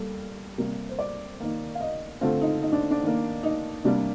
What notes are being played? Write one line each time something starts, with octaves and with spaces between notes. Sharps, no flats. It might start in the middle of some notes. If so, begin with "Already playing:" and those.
Already playing: G3 A#3 A4
C3 G3 A#3 A#4
C5
D5
D#3 A#3
F5
D#5
D3 A3 C4 F4
D#4
D#4
D4
D4
D#3 A#3
D#4
C3 G3 A#3 D4